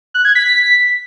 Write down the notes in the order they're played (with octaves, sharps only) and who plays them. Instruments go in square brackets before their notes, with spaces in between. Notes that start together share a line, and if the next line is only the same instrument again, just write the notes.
[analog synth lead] F#6
G#6
B6
B6